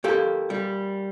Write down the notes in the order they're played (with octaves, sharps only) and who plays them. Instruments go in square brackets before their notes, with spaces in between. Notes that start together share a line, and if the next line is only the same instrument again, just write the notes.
[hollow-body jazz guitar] A#3 G4 A4
G3